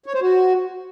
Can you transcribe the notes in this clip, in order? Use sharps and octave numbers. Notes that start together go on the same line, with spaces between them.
C#5
C5
F#4